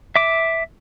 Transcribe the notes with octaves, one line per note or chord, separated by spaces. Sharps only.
E5 D6